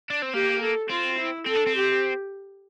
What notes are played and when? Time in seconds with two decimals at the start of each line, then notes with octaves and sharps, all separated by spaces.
0.10 D4
0.22 C4
0.34 A#3 G4
0.62 A4
0.90 C4 F4
1.19 E4
1.47 C4 A4
1.56 D4
1.66 C4
1.76 G4